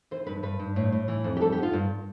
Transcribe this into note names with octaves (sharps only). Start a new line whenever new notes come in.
E3 C5
G2 B4
G2 B4
G2
A2
A2
E3
F2
G4
G3 A4
G4
B3 F4
G2